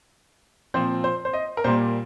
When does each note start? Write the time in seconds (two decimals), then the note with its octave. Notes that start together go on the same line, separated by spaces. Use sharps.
0.74 A#2 F3 C4 C5
1.04 C5
1.25 C5
1.33 D#5
1.57 A#4
1.64 A#2 G3 A#3 C5